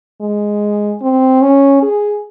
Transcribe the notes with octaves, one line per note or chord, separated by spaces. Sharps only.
G#3
C4
C#4
G#4